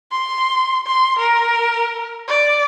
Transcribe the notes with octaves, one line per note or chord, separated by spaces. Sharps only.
C6
C6
A#4
D5